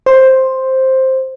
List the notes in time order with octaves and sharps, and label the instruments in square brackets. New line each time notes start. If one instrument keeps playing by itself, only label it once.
[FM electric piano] C5